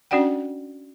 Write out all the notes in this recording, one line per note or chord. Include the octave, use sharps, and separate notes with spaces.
C#4 D4 F#4 D5 F#5 G5